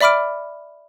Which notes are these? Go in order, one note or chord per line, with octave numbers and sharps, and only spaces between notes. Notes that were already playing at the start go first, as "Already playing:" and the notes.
D5 E5 B5 D6 F6 D7